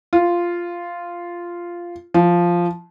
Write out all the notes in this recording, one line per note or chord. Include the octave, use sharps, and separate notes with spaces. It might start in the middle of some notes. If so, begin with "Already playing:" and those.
F4
F3